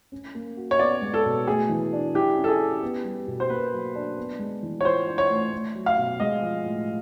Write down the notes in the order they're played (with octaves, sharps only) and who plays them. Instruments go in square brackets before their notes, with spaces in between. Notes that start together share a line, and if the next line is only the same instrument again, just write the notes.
[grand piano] C#4
A#3
F#4
[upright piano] C#5
[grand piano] B3 [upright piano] D5
[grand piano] G#3
[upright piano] A4
[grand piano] B2
[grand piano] A3 [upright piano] G#4
[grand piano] E3
D4
[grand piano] E4 [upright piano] G4
[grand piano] C#4
[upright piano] A4
G#4
[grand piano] G4
B3
G3
B2
[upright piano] C5
[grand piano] A#3 [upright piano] B4
[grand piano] F#3
D4
B3
G#3
E3
[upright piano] C#5
[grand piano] F4 [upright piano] C5
[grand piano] D4
[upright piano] C#5
[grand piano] A3
A3
F#3
[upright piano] F5
[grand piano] B2
[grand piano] G#3 [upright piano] D#5
[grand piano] F3
A2